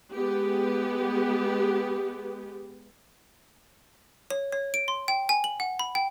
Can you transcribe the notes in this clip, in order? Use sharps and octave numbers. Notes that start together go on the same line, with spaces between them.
G#3 B3 G4
C#5
C#5
D7
C6
G5
G#5
F#7
F#5
B5
G5